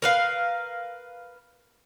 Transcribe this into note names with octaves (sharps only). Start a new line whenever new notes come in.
A#4 B4 F5